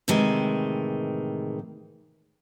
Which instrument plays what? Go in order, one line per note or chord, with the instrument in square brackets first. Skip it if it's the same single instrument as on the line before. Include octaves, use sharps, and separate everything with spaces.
[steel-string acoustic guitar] A2 C3 D#3 E3 G#3